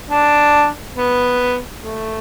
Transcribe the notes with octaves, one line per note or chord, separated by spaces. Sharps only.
D4
B3
A3